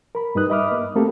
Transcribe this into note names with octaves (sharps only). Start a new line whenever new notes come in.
A#4 B5
G2 G3 D#4 B4 D#6 F#6
D#5 E5 B5 D6 D#6 F6
A#3
A3 A#3 C4 G4 A4